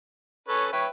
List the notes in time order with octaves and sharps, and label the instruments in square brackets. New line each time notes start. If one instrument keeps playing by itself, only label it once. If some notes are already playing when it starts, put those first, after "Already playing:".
[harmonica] C#4 A4 B4 [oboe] C#5
[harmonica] B4 E5 G5 [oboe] C#5